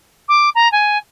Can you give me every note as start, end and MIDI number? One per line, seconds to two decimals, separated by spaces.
0.28 0.50 86
0.55 0.71 82
0.72 0.98 80